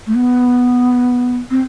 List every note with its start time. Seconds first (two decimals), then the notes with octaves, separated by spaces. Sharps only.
0.07 A3
0.15 B3
1.50 C4